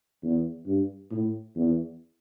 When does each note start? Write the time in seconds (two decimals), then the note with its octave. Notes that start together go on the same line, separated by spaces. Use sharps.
0.23 E2
0.67 G2
1.11 A2
1.56 E2